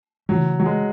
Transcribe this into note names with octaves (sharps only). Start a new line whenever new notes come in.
C#3 E3 F#3 A3 C#4
F#3
G#3